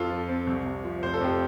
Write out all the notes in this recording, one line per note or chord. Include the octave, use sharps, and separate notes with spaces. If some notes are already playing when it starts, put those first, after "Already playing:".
Already playing: F2 F4 A4
F3
C4
C2
C3
F3
F1 C5
A4
F2 G4